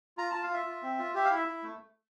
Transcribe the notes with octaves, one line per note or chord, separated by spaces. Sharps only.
F4 A#5
F4 A5
F5
F4 E5
F4
C4
F4
G4 E5
F5
E4 E5
E4
A3